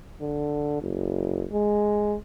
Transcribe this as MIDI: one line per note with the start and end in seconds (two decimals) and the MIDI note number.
0.21 0.78 50
0.82 1.45 30
1.53 2.16 56